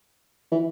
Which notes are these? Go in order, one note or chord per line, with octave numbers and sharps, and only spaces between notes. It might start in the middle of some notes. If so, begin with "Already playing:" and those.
E3